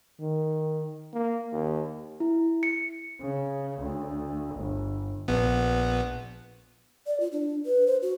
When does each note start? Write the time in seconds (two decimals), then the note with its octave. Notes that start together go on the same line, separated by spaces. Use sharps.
0.21 D#3
1.14 A#3
1.52 D#2
2.20 E4
2.63 C#7
3.21 C#3
3.80 D2
4.56 G1
5.28 A#1 B3
7.07 D5
7.20 F4
7.32 D4
7.66 B4
7.87 C5
8.02 F#4